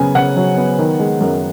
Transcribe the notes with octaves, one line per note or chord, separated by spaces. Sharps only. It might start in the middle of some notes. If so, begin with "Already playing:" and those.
Already playing: C#3 F#3 B3 G#5
C#3 F#5
F#3
B3
D#3
G#3
F#2